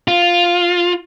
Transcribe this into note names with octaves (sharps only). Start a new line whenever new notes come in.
F4